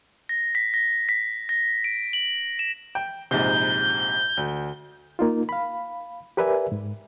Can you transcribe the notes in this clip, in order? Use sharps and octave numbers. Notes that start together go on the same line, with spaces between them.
A#6
B6
A#6
B6
A#6
D7
F#7
E7
G5
A#1 G#2 C3 G6
D2
A#3 D#4 F4
F5 B5
G4 A#4 B4 D5 E5 G#5
G#2